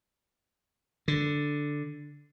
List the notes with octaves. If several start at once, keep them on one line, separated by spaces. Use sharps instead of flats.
D3